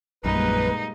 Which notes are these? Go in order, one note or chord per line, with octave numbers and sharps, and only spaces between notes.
A#1 F#2 A#2 G3 G#3 D#4 B4